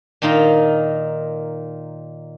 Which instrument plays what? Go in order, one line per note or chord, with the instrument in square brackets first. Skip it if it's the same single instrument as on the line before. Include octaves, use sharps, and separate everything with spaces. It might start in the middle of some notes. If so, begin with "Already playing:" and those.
[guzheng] A#2 D#3 D#4 F4 A#5